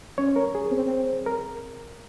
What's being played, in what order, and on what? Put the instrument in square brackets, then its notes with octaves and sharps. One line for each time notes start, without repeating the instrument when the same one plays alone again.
[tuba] C#4 [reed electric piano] C#5
[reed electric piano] A#4
G#4
[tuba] C4
[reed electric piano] A#4